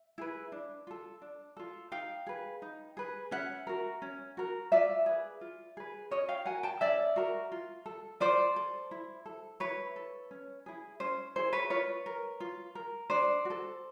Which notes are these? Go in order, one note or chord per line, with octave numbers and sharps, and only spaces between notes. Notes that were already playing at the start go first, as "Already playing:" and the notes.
Already playing: E5
E4 G#4 B4
D4
F4 A4
D4
F4 A4
D#4 F5 G5
G#4 B4
D#4
G#4 B4
C#4 E5 F#5
F#4 A#4
C#4
F#4 A#4
F4 D5 E5
G#4 B4
F4
G#4 B4
C#4 C#5 D#5
F5 G5
F#4 A#4 F#5 G#5
G5 A5
C#4 D5 E5
F#4 A#4
F4
A4
F4 C5 D5
A4
E4
A4
E4 B4 C#5
A4
C#4
E4 G#4
C#4 C5
E4 G#4 C5
B4 C#5
F4 B4 C#5
A#4
F4
A#4
D4 C5 D5
F#4
A4